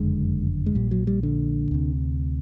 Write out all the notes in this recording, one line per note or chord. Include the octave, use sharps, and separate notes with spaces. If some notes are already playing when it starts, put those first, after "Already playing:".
Already playing: F#1 F2 D3 G#3
G#3
A#1 A#2 G3
F#3
G3
D3
D2 C3